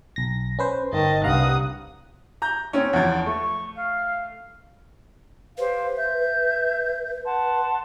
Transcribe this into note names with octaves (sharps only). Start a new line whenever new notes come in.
B1 A#6
C#4 B4 C5
G1 D#3 D#5 A5
C2 G2 F5 F#5 A#5 D#6
A#5 G6
C4 C#4 C#5
E2 F3
A3 C#6
F5
G4 B4 C5 F5
E5 G6
F#5 A5 C6